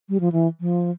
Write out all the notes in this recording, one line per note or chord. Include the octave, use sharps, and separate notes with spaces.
G3
F3
E3
F3